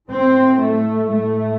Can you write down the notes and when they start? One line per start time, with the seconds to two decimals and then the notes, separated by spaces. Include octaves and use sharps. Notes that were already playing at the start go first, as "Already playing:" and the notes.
0.10 A2 C4
0.61 A3
1.12 A2 A3